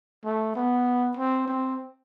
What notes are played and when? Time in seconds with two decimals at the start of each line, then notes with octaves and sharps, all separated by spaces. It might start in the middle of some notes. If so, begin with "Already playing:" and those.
0.25 A3
0.56 B3
1.17 C4
1.48 C4